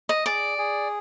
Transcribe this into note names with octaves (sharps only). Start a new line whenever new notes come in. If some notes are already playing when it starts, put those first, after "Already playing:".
D#5
G#4 D5
G#4